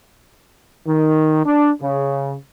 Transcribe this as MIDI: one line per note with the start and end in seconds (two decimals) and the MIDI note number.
0.87 1.42 51
1.44 1.70 62
1.82 2.34 49